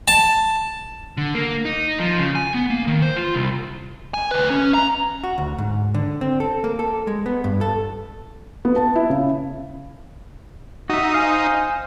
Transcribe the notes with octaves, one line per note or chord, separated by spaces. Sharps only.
A5
D3
A#3
D#4
F3
C#3
G#5
B3
A#3
D#3
C5
F4
C2
G#5
D2 B4
C#4
A#5
F#4
D2
G#2
D3
C4
A4
A#3
A4
G#3
B3
G2
A4
B3
A5
E4
C#3
D#4 F#4 E5
C5 F5 G#5